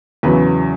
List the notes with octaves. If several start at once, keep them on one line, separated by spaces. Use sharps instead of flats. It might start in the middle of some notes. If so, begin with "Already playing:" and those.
E2 C#3 F#3 B4